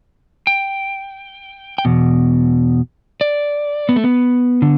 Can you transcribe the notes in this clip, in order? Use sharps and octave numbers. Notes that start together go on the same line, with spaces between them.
G5
G5
E2 B2
D5
B3
A3
B3
D3